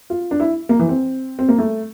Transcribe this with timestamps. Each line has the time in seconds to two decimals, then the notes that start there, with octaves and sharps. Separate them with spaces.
0.10 F4
0.31 D4
0.40 E4
0.69 A#3
0.79 E3
0.89 C4
1.39 C4
1.49 A#3
1.58 A3